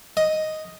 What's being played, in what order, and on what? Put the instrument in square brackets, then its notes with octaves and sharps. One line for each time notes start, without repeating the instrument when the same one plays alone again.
[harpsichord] D#5